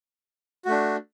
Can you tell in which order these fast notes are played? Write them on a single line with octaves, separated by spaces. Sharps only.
F#4 A3 D4